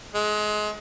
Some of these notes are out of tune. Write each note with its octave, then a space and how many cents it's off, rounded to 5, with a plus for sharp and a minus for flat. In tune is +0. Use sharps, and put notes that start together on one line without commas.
G#3 +25